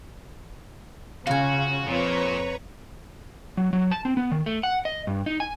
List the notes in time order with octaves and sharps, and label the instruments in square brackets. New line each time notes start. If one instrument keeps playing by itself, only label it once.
[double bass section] C#3 [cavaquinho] F4 G#5 [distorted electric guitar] F#4
[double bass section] F2 [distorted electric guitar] A#2 [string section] B4 C#5 A#5
[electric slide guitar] F#3
F#3
A5
C4
B3
D#3
A3
F#5
D#5
G2
D#4
G#5